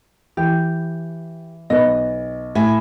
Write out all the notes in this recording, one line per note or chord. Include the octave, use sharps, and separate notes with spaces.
E3 G4
B1 B4 D#5
A2 E5 G#5